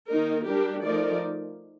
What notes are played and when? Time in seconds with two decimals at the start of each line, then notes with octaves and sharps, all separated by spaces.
0.09 D#3 A#3 D#4 A#4
0.47 G3 D4 G4 A#4
0.85 F3 A3 D#4 A#4 D5